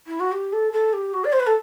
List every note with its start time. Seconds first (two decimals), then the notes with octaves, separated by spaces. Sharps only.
0.07 E4
0.20 F#4
0.32 G4
0.53 A4
0.73 A4
0.93 G4
1.13 F#4
1.24 D5
1.33 C5
1.40 B4
1.47 A4